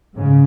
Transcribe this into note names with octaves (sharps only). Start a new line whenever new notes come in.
G#2 C#3